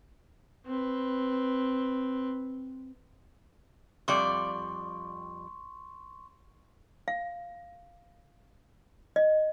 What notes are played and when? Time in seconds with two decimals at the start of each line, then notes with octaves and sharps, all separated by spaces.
0.66 C4 B4
4.08 F2 G3 D5 C6 C#6
7.08 F5
9.16 D#5